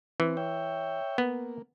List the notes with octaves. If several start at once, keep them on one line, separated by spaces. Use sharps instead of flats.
E3 C4
C#5 E5 G5
A#3 B3